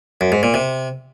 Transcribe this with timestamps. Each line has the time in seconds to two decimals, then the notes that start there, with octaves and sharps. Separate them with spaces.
0.21 F#2
0.32 G#2
0.43 A#2
0.54 C3